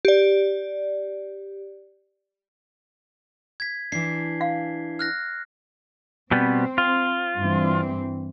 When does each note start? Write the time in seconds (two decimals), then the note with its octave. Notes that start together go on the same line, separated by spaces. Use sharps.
0.05 G4 D5
3.60 G#6 B6
3.92 E3 D4 C7
4.41 F5
4.99 F6 F#6 A#6
6.31 B2 G3 B3 C4
6.78 F4
7.39 G2 E3 C4